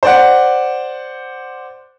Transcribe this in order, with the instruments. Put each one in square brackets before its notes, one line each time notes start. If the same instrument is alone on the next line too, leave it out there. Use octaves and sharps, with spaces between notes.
[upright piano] C5 D5 F#5